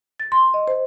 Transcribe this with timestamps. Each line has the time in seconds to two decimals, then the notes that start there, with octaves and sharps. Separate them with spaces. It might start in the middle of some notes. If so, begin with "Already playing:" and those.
0.20 A6
0.32 C6
0.54 D#5
0.68 C5